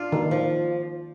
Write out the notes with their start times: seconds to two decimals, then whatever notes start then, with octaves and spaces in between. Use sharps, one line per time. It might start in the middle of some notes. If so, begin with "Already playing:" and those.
Already playing: D4 F4
0.12 D#3
0.31 F3